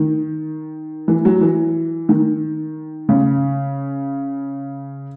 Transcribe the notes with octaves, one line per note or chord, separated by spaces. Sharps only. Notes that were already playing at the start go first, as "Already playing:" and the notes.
Already playing: D#3
E3
F#3
E3
D#3
C#3